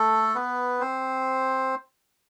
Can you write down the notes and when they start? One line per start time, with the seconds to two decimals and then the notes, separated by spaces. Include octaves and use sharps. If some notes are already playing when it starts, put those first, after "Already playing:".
Already playing: A3 A4
0.35 B3 B4
0.80 C4 C5